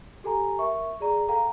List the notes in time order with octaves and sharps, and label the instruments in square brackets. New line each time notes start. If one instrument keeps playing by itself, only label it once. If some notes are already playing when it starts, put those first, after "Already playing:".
[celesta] G4 A4 G#5 A#5
A#4 E5 C#6
G#4 D5 A#5
A4 F5 G5 A#5